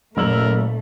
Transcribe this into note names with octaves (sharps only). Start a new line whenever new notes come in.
F#1 A#2 A3 A#4 E6 F#7